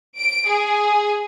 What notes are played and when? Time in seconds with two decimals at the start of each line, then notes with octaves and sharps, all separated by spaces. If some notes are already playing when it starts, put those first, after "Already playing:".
0.18 D7
0.49 G#4